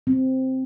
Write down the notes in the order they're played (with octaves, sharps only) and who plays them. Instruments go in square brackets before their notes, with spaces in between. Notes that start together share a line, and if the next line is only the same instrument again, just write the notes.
[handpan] C4